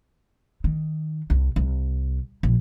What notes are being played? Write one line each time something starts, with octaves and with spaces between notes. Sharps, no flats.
D#3
C2
C2
A#1